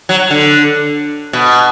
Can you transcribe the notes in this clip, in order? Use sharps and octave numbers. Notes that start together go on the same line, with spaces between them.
F#3
D3
B2